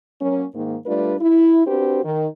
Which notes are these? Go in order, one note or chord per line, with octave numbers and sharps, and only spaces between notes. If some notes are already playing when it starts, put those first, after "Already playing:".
F#3 A#3 C#4
G#2 D#3 A#3
G3 A3 D4 F4 B4 D5
E4
C4 D4 F#4 G4 B4 C5
D#3